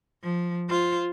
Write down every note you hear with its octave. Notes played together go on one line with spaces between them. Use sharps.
F3
F4 C5